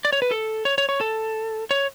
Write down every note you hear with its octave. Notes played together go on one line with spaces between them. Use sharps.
D5
C#5
B4
A4
C#5
C#5
C#5
A4
C#5